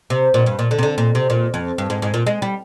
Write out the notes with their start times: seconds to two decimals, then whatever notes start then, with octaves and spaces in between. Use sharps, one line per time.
0.10 C3
0.34 A#2
0.46 G2
0.59 A#2
0.71 D3
0.79 C3
0.83 D3
0.98 A#2
1.15 C3
1.30 A#2
1.54 F2
1.78 G2
1.90 G#2
2.02 G#2
2.14 A#2
2.27 G#3
2.42 G3